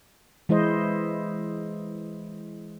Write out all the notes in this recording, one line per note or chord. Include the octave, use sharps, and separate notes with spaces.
E3 G#3 E4 C5 D#5